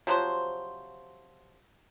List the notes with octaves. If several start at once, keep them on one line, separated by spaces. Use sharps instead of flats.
C3 F3 F#3 C5